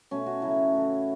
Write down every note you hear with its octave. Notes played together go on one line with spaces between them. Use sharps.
B2 A3 C#4
F#4
C#3 F#3 A3 E4
A2 E3 A3